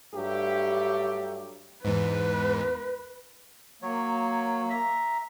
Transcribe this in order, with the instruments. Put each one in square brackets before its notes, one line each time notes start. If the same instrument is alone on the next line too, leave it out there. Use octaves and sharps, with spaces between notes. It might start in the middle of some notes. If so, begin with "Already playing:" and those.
[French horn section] G2 F#3 A3 G4
[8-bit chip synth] E2 G#2 [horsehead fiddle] B4
[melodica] F#3 C#5 [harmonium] A#3
[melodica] E5 A#5